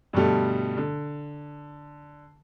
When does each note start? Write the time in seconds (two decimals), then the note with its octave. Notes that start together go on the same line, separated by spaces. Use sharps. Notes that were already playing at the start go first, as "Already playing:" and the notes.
0.13 G2 B2 D3 G3 A3
0.77 D3